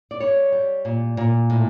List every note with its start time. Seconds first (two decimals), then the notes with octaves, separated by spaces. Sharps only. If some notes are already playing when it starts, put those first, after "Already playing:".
0.11 D5
0.20 G3 C#5
0.52 G3
0.85 A#2
1.17 A#2
1.50 A2